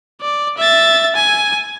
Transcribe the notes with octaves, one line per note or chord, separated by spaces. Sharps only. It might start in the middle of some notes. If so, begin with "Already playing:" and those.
D5
E5 A6
G#5